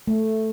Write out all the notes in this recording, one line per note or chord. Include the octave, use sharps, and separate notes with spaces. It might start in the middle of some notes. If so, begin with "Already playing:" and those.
A3